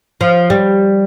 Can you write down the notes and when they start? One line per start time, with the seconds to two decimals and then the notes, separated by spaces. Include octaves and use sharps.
0.21 F3
0.50 G3